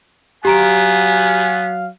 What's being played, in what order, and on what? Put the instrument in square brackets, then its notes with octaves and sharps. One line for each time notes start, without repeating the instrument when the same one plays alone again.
[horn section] F#3 F5 [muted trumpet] B3 [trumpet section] F#4 G#5 [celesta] G4 A#5 D7